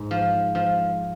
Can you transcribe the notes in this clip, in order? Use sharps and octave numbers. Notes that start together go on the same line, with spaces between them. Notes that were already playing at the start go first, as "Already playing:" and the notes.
Already playing: G#2
F3
F3